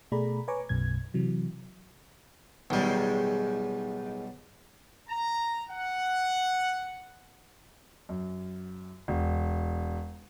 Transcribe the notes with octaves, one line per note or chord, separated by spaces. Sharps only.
B2 A3 G#4 D5 A#5 B5
B4 C#5 G#5 A#5 C#6 D6
B1 F#2 B2 G#6
C3 E3 F#3
B1 A2 D#3 G3 G#3
A#5
F#5
F#2
E1